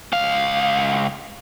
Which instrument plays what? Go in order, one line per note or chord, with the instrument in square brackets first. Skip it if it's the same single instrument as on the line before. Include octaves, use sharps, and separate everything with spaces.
[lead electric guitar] C#2 F5